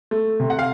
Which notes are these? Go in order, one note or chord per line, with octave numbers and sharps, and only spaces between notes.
A3
C3
F#5
F5